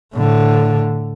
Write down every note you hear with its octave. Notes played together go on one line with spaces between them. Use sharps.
A2 D3